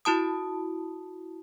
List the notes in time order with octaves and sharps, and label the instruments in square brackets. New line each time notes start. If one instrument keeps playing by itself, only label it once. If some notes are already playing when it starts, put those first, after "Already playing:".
[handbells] E4 F#4 A5 D#6